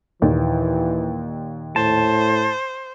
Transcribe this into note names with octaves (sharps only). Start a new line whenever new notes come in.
D#2 A#2 E3
A2 C5 A5